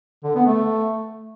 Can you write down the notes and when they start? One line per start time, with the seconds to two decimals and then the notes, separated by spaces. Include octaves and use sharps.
0.24 D3
0.35 B3
0.46 A3